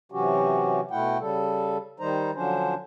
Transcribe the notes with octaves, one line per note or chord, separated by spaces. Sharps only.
C3 E3 F#3 C#4 F#4 G4
B2 A3 E4 F#5 G5
C#3 G3 A4
D#3 G3 D#4 C5 A#5
D3 F3 F#3 C#4 D4 C5